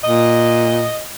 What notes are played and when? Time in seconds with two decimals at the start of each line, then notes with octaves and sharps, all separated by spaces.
0.04 A#2 D#5